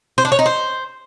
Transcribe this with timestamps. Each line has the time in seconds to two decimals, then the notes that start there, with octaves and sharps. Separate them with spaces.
0.18 C5
0.25 D4
0.32 C#5
0.39 D#4
0.46 C5